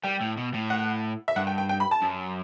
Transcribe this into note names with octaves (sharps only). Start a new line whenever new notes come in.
G3 G5
A2
B2
A2
F#5
E5
G2 F#5
G5
G5
G5
B5
A5
F#2